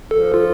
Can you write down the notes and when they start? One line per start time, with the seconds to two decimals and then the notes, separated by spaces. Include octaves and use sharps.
0.11 F3 A4
0.34 F4